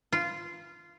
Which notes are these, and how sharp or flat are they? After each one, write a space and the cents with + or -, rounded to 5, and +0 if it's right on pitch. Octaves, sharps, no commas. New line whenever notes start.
F4 -15